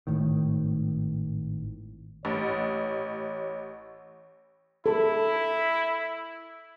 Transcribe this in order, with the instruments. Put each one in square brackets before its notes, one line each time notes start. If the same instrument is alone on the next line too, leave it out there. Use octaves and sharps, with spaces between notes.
[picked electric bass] G#1 A2 D#3
[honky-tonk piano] A1 [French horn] C#5
[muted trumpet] E4 [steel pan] A4